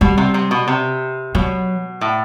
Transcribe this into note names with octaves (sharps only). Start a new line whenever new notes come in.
B2 G3
C3
C3
B2
C3
B2 F#3
A2